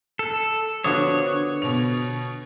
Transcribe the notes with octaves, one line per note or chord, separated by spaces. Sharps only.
A4
D3 F3 B3 F#4 C#5 D6 D#6
B2 F7